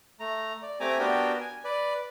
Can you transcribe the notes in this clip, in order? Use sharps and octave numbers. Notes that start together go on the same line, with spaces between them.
A3 A#5
D5
A3 C4 G4 G#5 A#5 D6
B3 D4 F#4 G4 A#4 G5
G#5
B4 D5